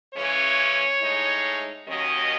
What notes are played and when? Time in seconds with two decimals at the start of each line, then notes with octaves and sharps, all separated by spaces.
0.13 C#3 E3 G#3 C#4 C#5
1.01 A2 G#3 D#4
1.87 D#2 D#3 F#3 C#4 D#5